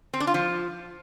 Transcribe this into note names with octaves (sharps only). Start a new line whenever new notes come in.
C4
D4
F4
F3